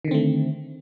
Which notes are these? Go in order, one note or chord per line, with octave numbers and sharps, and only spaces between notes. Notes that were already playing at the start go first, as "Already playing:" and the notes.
D3 D#3 A3 C4